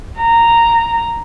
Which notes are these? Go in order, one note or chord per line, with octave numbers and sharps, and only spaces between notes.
A#5